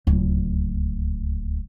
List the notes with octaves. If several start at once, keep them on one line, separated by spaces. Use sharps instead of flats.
D1 C#2